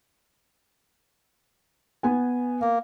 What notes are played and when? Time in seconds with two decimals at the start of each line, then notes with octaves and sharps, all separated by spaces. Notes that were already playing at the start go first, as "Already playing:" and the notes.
2.03 B3 B4 G#5
2.61 A#3